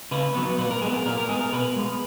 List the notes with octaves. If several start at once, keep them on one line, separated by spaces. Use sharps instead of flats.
C#3 B4
F#3 B3
A#2 B4
A#4
G#3 B3 G#4
A#4
A#2 A#4
A#4
G#3 B3 G#4
A#4
B2 B4
G#3 B3